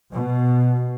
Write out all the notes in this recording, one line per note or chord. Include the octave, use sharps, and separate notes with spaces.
B2